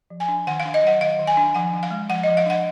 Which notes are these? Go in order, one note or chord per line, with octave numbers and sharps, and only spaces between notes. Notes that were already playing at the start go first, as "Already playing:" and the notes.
F3
G#5
D4
D#3 F#5
F5
D4
D#5
F#3 F#5
D#3 F5
D#3
G#5
D4
F3 F#5
D4
F5
G#3
F3 F#5
F3 D#5
F5
D4 F#5